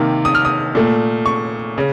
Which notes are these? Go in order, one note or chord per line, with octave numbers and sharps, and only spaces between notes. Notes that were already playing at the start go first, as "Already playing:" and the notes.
Already playing: C3 D#3 A#3
D#6
F6
D#6
A#2 A3
C#6
C#3